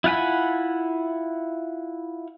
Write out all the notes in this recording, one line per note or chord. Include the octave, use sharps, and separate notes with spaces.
E4 F4 F#5 G#5 B5